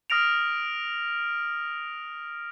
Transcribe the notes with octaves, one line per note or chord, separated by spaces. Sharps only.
D#6 F6 A#6 D7 F7